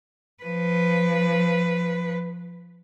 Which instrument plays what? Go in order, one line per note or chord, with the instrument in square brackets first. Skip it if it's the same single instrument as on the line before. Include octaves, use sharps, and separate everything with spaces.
[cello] F3 B4